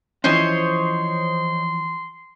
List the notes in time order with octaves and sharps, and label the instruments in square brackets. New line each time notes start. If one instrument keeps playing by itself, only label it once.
[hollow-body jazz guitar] E3 F3 C#4 [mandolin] C5 C#5 D#5 [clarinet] C6